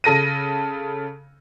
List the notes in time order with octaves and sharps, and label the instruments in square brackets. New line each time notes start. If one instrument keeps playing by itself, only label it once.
[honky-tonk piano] C#3 A4 A#6 D#7